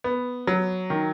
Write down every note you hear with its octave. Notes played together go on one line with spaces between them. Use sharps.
B3
F#3
D#3